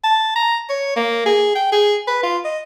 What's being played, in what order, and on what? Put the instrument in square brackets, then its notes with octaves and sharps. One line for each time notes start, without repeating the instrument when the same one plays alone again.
[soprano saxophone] A5
A#5
C#5
A#3
G#4
G5
G#4
B4
F4
D#5